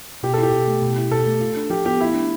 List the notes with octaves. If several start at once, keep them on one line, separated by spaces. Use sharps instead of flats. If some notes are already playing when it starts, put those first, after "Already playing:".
B2 G4
A4
E4
G4
B2
A3
B2
E4
B2 A4
A3
F4
D4
F3 G4
B3 G4
E4 F4
D4